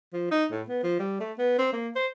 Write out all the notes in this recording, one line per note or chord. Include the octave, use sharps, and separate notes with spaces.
F3
D#4
A2
B3
F3
G3
A3
B3
C4
A#3
C5